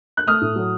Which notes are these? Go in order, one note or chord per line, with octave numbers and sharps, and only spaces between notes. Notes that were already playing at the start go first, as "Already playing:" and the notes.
F#6
A3 D#6 F6
A2
F#3